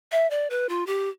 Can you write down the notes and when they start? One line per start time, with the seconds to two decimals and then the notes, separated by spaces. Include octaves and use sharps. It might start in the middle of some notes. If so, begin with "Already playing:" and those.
0.12 E5
0.30 D5
0.50 B4
0.69 F4
0.87 G4